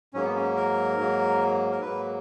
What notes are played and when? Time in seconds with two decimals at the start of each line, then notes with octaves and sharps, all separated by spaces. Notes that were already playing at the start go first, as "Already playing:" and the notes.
0.13 G#2 F#3 A#3 C#4
0.24 B3
0.35 C#4
0.56 A#4
0.98 G#2 F#3 A#3
1.72 A#4
1.81 G#2 F#3 A#3 B4